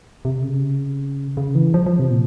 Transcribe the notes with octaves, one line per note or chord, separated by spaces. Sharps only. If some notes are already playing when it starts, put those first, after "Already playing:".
C3
C#3
C#3
E3
F3
F3
C3
A#2